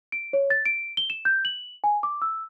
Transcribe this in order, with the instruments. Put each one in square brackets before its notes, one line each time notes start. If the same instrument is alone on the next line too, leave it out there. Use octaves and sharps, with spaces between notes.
[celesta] D7
C#5
A6
D7
G7
E7
G6
F#7
G#5
D6
E6